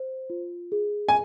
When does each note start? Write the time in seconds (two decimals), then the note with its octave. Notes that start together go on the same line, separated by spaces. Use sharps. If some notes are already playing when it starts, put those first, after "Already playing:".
Already playing: C5
0.30 F4
0.72 G#4
1.09 G#5